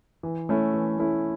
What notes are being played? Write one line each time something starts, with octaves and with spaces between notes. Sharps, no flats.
E3
A3 C#4 E4
E3
A3 C#4 E4